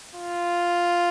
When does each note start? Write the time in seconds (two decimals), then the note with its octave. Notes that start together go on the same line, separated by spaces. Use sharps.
0.15 F4